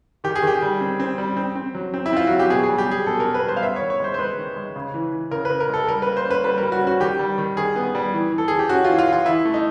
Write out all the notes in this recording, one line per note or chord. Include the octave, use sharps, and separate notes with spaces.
D#3 G4
G#4
D#3 G4
G3
C4
C4
G3
C4
C4
F#3
C4
E4
C4 F4
F#3 F#4
G4
B2 G#4
G#4
G3
G4
B2 G#4
B2 A4
A#4
B2
B4
G3 C5
F5
B3 E5
C#5
D#3
C#5
G#3 C5
C5
G#3 B4
D#3
G#3
C#3
E3
E3
C#3 A#4
C#3 B4
A#4
G#3 A4
G3 A#4
A#3 B4
C5
C#4
B4
G3 B4
A#4
G3
F#4
C#4 F#4
D#3 G4
G3
D#3
D#3 G#4
B3
G3
E3
E3
A4
E3 G#4
G4
C#4 F#4
E3 F4
F4
E3
F4
E3 E4
A3
D#4